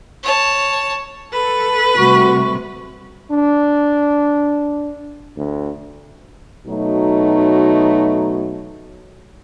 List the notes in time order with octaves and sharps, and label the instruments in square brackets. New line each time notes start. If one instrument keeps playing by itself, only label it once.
[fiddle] C#5 A5
[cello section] A4 [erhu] B4
[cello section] C3 G3 A3 [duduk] F#4 [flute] C#6
[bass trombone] D4
D2
[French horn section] B2 F#3 A3 D#4